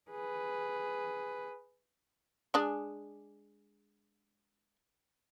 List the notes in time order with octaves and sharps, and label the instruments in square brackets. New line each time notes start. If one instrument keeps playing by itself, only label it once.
[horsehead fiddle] G#4 B4
[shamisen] G#3 D4 G#4